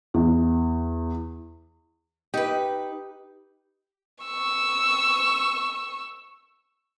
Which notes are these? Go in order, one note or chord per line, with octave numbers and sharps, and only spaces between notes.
E2
D#4 G4 B4
C#6 E6